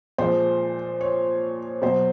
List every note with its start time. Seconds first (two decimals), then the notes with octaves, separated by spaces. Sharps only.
0.18 A#2 F3 G#3 C5
1.01 C#5
1.82 B2 F#3 C5